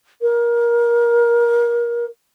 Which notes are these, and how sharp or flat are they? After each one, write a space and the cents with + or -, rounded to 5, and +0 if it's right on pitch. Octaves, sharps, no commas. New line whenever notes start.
A#4 +25